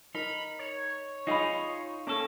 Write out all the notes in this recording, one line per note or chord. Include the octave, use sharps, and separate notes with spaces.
D#4 A#4 B5
C#5
D#4 F4 G#4 D#5 B5
A#3 C#4 A4